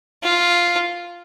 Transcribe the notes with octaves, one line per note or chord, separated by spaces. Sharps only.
F4